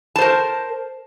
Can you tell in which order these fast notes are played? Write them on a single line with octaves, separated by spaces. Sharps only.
A5 C5 A#4